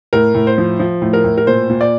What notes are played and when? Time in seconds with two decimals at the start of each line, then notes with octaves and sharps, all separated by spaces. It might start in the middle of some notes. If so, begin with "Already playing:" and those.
0.13 A2 A#4
0.35 A2
0.47 C5
0.58 F3
0.79 F3
1.02 A2
1.13 A#4
1.24 A2
1.38 A#4
1.47 A#2 C5
1.70 A#2
1.81 D5